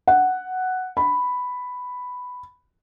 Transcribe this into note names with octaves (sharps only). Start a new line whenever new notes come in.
F#5
B5